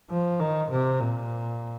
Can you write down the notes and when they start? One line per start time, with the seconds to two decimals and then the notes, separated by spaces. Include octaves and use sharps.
0.10 F3
0.40 D#3
0.70 C3
1.00 A#2